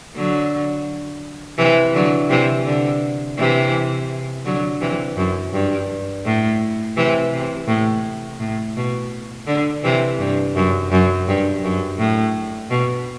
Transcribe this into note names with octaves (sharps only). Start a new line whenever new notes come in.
D3 F#3
C3 E3
D3 F#3
C3 E3
D3
C3 E3
D3 F#3
C3 E3
F#2
G2
A2
C3 E3
C3
A2
A2
B2
D3
C3 E3
G2
F#2
F#2
G2
F#2
A2
B2